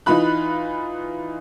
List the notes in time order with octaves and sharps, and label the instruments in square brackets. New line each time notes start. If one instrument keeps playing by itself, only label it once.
[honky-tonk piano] E3 D#4 F4 B5 F#6